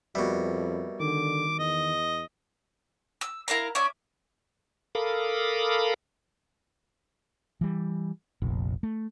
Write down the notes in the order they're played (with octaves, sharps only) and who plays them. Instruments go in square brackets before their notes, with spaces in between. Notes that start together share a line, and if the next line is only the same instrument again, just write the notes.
[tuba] F2 [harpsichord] B2 G3 [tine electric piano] A#4 B4 E5
[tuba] D3 [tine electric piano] D#3 [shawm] D6
[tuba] E2 [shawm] D#5
[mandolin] E6
E4 A#4 F5 A#5
C#4 D5 E5
[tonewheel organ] A4 A#4 F5 B5 D6 D#6
[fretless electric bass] E3 G3
F1 A#1
A3